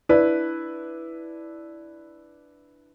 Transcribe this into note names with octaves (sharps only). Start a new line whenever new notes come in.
D4 E4 B4